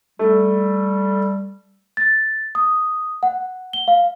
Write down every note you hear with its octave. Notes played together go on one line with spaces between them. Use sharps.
G3 A3
A6
D#6
F#5
G7
F5